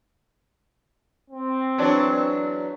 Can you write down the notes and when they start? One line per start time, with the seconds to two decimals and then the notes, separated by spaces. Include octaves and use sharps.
1.30 C4
1.78 E2 F#3 D4